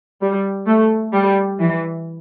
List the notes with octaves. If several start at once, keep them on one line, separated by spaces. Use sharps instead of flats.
G3
A3
G3
E3